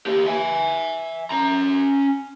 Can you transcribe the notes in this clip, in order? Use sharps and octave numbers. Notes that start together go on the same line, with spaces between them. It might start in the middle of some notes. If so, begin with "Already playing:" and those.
A#3 G4
E5 G#5
C#4 A#5